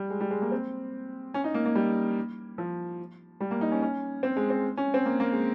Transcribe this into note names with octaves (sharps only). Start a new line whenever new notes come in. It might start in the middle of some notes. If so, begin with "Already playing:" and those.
Already playing: G3
G#3
G3
G#3
A#3
C4
C#4
D#4
A#3
A#3
G3
F3
G3
A#3
D#4
C#4
C#4
C4
G#3
C4
C#4
C4
A#3
A#3
G#3